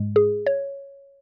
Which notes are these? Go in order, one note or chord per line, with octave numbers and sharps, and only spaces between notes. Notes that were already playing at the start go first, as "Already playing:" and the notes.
Already playing: G#2 G#3
G#4
C#5